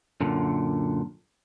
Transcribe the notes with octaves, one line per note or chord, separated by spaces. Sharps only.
F#2 A#2 D3